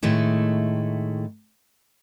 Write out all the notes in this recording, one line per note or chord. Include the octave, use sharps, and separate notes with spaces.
A2 D#3 G#3 A3 E4